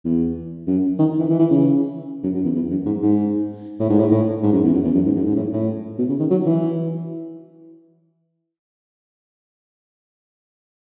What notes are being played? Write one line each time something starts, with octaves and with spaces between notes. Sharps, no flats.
E2
F#2
D#3
E3
E3
E3
C#3
F#2
F#2
E2
E2
F#2
G#2
G#2
A2
G#2
A2
A2
G#2
F#2
E2
F#2
E2
F#2
G#2
F#2
G#2
A2
A2
B2
C#3
D#3
F#3
E3